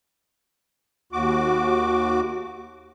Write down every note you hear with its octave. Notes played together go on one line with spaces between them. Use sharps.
D#2 F#4 D6